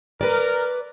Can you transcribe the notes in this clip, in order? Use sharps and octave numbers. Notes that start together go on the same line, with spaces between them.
A#4 B4 D5